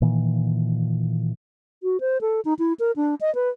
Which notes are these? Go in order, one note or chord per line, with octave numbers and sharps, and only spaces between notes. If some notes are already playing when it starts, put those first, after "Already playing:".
A#2 D#3 E3
F#4
C5
A4
D#4
E4
A#4
D4
D#5
B4